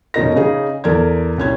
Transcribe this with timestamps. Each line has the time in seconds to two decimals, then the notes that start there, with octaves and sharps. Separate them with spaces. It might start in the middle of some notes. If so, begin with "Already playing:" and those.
0.14 F1 B2 C#4 D#4 A#4 A#6
0.36 C#3 D#4 G#4
0.84 E2 A4 A#4 D5 G#6
1.38 C2 C#4 G#6